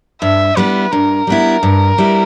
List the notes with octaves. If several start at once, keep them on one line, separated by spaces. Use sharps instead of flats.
G2 E5
G3 B3 E4 B4
G2 A#4
G3 B3 E4
G2
G3 B3 E4